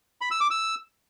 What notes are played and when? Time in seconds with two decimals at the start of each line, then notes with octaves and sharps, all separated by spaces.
0.21 B5
0.31 E6
0.41 D6
0.51 E6